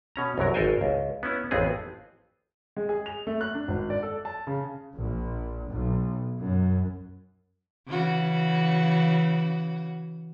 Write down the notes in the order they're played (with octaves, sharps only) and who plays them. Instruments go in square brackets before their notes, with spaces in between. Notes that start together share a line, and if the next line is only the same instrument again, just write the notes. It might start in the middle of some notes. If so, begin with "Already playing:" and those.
[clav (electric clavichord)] B2 C#4 A#5
C2 F#2 F#3 A#4
G#1 A4 A#4 C5 G5 G#5
C#2
B3 C#4 E4
A1 F2 B3 C4 G#4
[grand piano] G#3
G#4
F7
A3
F#6
D4
G#1
D5
A4
A5
C#3
[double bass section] A#1
B1
F#2
[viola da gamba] C#3 E3 F#4